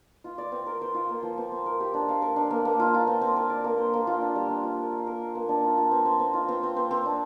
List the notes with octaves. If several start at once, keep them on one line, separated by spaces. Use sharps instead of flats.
F4
D5
C4
A#4
C5
F4
A#3
F3
C4
C4
A#4
G4
D4
F5
A#4
D4
A#3
A#3
F4
F4
C4
C4
A#4
D5
A#3
C5
A#3
F4
D4
G3
D4
F4
A#4
F5
A#4
F5
A#3
D4
F4
F4
C4
C4
C4
F4
C4
C4
C4
C4
D4